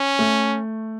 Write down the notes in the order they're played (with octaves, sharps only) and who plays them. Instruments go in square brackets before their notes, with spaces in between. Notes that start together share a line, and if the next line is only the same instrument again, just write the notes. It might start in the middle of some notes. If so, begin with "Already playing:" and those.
Already playing: [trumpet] C#4
[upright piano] A3